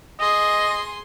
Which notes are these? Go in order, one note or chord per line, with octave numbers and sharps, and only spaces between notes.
G#4 D#5 C6